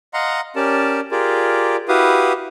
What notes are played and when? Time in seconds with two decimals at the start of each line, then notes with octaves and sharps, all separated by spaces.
0.14 D#5 F5 F#5 A#5 C6
0.56 C#4 G4 A#4 D5 A5
1.11 F4 G4 G#4 A#4 D5
1.88 E4 F#4 G4 B4 F5 D#6